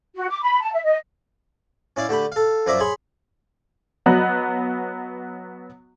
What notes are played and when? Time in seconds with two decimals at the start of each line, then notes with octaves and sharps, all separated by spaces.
0.16 F#4
0.29 D6
0.42 B5
0.61 A5
0.74 E5
0.85 D#5
1.96 C#4 E4 D5 F5
2.09 D3 A3 G4 B5
2.32 A4 F5
2.66 F#2 F3 D5 E5 A#5 D6
2.80 G#4 C#5 B5 C6
4.06 F#3 B3 D#5 F#6